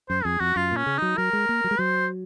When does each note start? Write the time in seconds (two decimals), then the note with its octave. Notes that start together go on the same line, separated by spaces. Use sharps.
0.09 F#2 C5
0.25 F2 G#4
0.40 F2 F#4
0.56 F#2 F4
0.71 A#2
0.77 C#4
0.86 C#3
0.98 F#3 D#4
1.17 F#3 A#4
1.33 G#3
1.49 A#3
1.64 F#3
1.71 G#3
1.79 F#3 C5